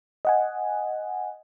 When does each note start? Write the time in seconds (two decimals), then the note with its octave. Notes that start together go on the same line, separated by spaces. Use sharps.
0.25 D#5 F#5 G#5